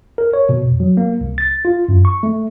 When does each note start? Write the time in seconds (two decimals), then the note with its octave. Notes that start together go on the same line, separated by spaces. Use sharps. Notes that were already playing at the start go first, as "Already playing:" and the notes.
0.18 A#4
0.33 C#5
0.49 B2
0.64 F2
0.80 F#3
0.97 A#3
1.21 C2
1.38 A6
1.65 F4
1.88 F#2
2.05 C#6
2.23 A3